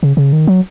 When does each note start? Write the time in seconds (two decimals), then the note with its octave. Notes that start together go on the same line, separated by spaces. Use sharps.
0.03 C#3
0.17 C#3
0.33 D#3
0.47 F#3